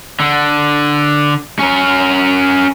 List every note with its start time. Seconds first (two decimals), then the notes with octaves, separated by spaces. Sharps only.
0.20 D3
1.59 C#4 A#4